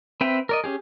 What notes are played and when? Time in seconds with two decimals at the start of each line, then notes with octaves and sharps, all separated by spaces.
0.21 C4 B4 E5 G5
0.49 A#4 D5 D#5
0.64 C#4 G4 G#4